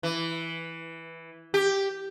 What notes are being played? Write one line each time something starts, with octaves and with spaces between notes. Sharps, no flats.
E3
G4